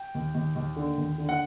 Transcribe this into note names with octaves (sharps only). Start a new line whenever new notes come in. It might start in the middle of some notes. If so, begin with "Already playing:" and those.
Already playing: G5
D#2
D#2
D#2
D3
D#2
D3
F#5